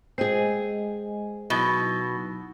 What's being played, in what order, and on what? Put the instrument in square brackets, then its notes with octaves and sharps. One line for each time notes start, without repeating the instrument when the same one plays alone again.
[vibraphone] G#3 D#5 G#5 [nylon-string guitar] C4 G#4
[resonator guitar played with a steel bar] B2 [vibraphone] F#3 D#4 E4